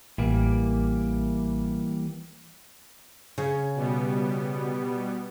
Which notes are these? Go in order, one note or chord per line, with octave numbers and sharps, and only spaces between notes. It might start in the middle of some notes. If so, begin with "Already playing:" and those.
A1 E3 G3 A#3
C#3 C#5
B2 G3 B3